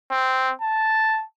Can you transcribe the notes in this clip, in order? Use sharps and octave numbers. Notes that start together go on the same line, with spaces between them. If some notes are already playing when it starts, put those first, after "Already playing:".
C4
A5